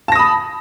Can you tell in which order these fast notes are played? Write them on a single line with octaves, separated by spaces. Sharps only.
A5 A#6 D#6 B5